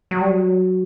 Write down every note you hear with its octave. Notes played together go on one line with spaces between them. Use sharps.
F#3
G3
F#3